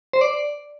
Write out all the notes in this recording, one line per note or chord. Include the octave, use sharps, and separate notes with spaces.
C5
D5